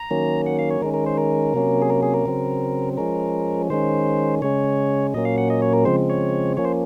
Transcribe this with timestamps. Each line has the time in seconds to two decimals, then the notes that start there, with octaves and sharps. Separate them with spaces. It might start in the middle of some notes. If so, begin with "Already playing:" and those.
Already playing: A#5
0.11 D#3 F#3 A#3 C#4
0.46 F#5
0.59 F5
0.71 C#5
0.82 D#3 G#3 C#4 A#4
0.94 A#4
1.06 C5
1.18 A#4
1.54 C3 F#3 A#3 C#4
1.82 G#4
1.90 A#4
2.03 G#4
2.14 A#4
2.26 C#3 F#3 C4
2.97 F3 G#3 C#4 A#4
3.70 D#3 G#3 C#4 C5
4.42 C#3 G#3 C#4 C#5
5.14 A#2 F#3 A#3 C#4 D#5
5.25 F5
5.38 F#5
5.50 D#5
5.62 C#5
5.73 A#4
5.85 C#3 F3 G#3 C4 C5
6.10 C#5
6.57 F3 A#3 C#4 C#5
6.65 C5